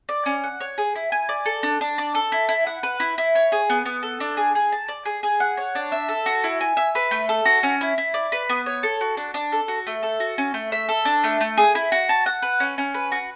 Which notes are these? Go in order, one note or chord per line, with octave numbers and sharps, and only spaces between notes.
D5
C#4
F#5
C#5
G#4
E4
G#5
D5
A4
D4
D4
D5
A4
E4
E4
F#5
B4
E4
E4
C#5
G#4
B3
B3
A4
D4
G#4
G#4
A5
D5
G#4
G#4
F#5
C#5
D4
E5
A4
F#4
E4
G#5
E5
B4
A3
A4
F#4
C#4
E4
E4
D5
B4
B3
C#5
A4
F#4
D4
D4
A4
F#4
A3
A4
F#4
C#4
A3
E5
A4
D4
A3
A3
G#4
E4
F#4
A5
F#5
B4
C#4
C#4
B4
F#4